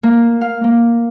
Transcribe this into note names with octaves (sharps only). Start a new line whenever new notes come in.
A#3
F5
A#3